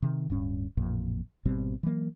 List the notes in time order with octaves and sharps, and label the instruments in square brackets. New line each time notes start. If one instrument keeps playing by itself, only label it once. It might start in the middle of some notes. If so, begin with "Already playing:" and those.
[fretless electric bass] C3 D#3
D1 G2 C#4
A1 F2 A#2
G#1 B2 G3 C4
E3 F#3 A#3